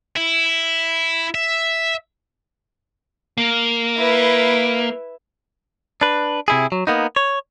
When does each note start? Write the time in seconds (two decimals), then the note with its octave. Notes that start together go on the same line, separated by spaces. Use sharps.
0.16 E4
1.35 E5
3.38 A#3
3.98 E4 B4
6.01 D4 B4
6.48 C3 E4 G#4
6.72 F#3
6.87 A#3 B3 D#4
7.16 C#5